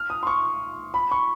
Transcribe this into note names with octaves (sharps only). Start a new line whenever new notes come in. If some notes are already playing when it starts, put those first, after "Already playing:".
Already playing: F6
D#6
C6
C#6
B5
C#6